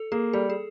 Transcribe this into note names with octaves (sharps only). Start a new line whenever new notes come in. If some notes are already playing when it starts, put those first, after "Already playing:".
Already playing: A4
A#3 G#4
G3 A4
G#4